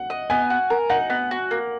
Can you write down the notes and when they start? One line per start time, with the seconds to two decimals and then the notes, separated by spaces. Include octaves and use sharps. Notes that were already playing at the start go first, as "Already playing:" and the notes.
Already playing: F#5
0.10 D#5
0.30 B3 G#5
0.50 F#4
0.70 A#4
0.90 D#4 F#5
1.10 B3
1.31 F#4
1.51 A#3